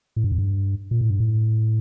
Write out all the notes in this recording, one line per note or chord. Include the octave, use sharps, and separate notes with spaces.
A2
G2
F2
G2
A#2
A2
G2
A2